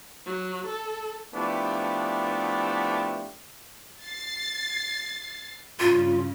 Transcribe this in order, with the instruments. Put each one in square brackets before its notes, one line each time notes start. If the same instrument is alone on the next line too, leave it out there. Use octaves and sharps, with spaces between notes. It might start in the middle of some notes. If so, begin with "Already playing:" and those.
[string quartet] F#3
A4
[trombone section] F3 A3 B3 D4 E4 G4
[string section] A6 C7
[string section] G2 C#3 [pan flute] F4